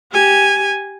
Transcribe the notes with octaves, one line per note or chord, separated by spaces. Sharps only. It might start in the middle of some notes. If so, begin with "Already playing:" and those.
G4 G#5